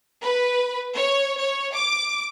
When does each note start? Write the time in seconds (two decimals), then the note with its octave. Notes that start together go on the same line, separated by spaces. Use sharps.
0.22 B4
0.94 C#5
1.37 C#5
1.74 D6